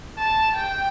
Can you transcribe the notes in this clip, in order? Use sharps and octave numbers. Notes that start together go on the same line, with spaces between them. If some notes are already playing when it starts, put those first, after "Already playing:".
A5
G5